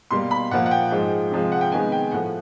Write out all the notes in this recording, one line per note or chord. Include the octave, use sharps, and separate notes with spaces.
B2 G3 A#3 C6
B5
A#2 F3 A#3 F#5
F#5
G5
G#2 F3 G#3
C3 F3 G#3
F#5
G5
C3 D#3 G#3 B3 G#5
G5
A2 F3 A3 F#5